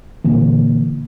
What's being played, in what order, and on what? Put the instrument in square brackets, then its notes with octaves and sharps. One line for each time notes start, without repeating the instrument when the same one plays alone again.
[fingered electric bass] A#2 D3 E3 A#3